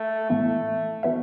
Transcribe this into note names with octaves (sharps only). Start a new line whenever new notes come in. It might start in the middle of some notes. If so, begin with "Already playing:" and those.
Already playing: A3
A2 E3 A3 B3 E4
E3 B3 F#4 B4 E5